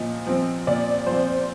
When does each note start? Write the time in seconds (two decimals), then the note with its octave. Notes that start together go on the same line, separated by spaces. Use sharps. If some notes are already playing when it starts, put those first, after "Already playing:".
Already playing: A#2 F3 D#5
0.26 F3 C4
0.67 A#2 D5
1.06 F3 C5
1.12 C4